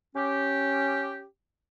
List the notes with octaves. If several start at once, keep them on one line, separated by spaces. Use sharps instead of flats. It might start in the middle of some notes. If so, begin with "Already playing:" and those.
C#4 G4